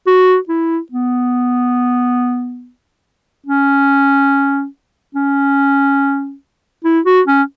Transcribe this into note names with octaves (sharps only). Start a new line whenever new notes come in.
F#4
E4
B3
C#4
C#4
E4
F#4
C#4